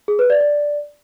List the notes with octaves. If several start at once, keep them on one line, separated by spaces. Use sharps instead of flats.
G#4
B4
D5
D5